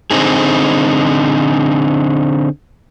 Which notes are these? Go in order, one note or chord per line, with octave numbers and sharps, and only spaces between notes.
D3 C4 D#4 G#4